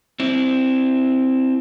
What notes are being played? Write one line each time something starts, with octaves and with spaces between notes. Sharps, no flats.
C4 E4